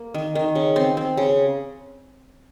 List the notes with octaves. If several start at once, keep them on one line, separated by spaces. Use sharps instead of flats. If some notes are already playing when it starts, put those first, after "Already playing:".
Already playing: A#3
D#3
D#3
C#3
C4
C4
C#3